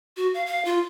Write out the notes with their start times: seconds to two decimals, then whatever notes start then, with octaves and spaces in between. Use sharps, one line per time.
0.17 F#4
0.34 F5
0.46 F5
0.65 F4